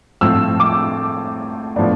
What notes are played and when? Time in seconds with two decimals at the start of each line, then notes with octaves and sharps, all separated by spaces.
0.21 A2 F3 C4 E6
0.60 D6
1.76 A2 F3 B3 D4